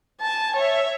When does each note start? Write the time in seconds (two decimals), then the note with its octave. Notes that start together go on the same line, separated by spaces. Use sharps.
0.21 G#5 A5
0.56 C#5 E5